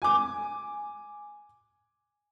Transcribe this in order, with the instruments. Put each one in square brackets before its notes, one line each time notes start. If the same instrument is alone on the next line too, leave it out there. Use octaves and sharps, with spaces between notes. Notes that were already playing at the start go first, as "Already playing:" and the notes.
[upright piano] G#5 D6